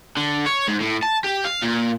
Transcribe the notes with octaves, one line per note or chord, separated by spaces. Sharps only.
D3
C#5
G#2
A2
A5
G4
F5
A#2